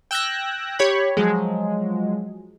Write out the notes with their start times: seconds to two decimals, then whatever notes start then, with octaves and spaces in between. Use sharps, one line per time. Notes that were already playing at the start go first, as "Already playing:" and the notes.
0.11 G5 E6 F#6 G#6 A#6
0.79 G4 C#5 B5
1.17 F3 F#3 G#3